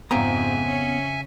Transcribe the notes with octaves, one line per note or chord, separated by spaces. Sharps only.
F2 G#2 C#3 B3 C4 E5 G#5 A#5
C#4